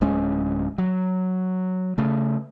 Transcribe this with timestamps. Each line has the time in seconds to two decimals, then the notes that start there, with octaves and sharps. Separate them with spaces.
0.01 D1 G#3 C#4
0.78 F#3
1.98 C#3 A3